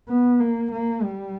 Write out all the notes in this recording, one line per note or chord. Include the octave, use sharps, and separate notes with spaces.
B3
A#3
A#3
G3